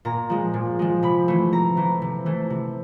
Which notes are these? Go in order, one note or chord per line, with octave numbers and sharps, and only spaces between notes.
A#2 A#5
F3 G#3
A#2
F3 G#3
C3 B5
E3 A3
C3 A#5
E3 A3
C3
E3 A3
C3